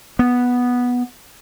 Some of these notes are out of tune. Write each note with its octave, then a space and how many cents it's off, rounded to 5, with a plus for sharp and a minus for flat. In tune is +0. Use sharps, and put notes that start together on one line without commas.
B3 -5